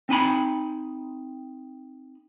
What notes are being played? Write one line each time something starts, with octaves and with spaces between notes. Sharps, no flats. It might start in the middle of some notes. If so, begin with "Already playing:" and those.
C4 D#4 G#5 B5